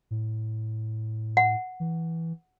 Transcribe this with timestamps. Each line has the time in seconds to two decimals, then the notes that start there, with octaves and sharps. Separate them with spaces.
0.11 A2
1.37 F#5
1.80 E3